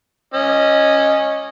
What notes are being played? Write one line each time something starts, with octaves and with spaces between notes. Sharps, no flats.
C#4 D#5